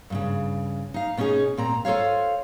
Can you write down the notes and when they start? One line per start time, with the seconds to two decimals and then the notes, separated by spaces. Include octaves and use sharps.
0.10 G2 A#2 C#3
0.94 D#4 F5
1.17 B2 B3 C#4 D#4 G#4
1.57 A#2 C4 A#5
1.85 F4 A4 C5 C#5 F5